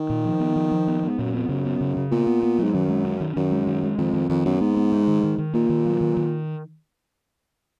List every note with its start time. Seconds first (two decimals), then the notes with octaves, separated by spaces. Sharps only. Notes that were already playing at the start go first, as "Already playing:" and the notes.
Already playing: D#3
0.10 A#2
0.25 F3
0.40 B3
0.56 F3
0.72 F3
0.88 B3
1.03 B3
1.08 G#2
1.18 F#2 A#2
1.34 F2 B3
1.49 F#2 C#3
1.65 B3
1.81 C#3
1.97 C#3
2.11 A#2 B3
2.27 B3
2.43 B3
2.58 F#3
2.64 G#2
2.73 F#2 D#3
2.89 G#3
3.05 C#4
3.20 D#3
3.36 F#2 D#3
3.51 G#3
3.67 D#3
3.83 G#3
3.98 F2 D#3
4.13 D#3
4.30 F2 D#3
4.45 F#2 B3
4.61 G#2 B3
4.77 B3
4.92 G#3
5.07 D#3
5.23 D#3
5.38 D#3
5.54 A#2 A#3
5.70 D#3
5.86 F#3
6.01 D#3
6.17 D#3